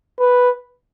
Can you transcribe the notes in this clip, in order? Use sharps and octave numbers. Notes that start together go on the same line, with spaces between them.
B4